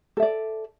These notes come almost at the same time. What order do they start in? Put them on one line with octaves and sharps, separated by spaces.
A4 E5 D5